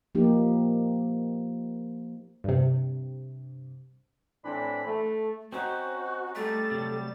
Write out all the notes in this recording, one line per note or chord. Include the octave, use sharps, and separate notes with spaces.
F3 A#3 D#4 G4
G2 C3
A2 E3 C4 D4 B5
A3
C4 C#4 D#4 F#4 C5
G3 A3 A4 A6
C3 F#3